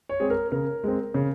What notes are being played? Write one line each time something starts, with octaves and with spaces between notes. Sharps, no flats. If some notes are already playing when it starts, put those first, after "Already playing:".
C#5
G#3 C4 G#4
A#4
C#3 A#4
G#3 C4
C#3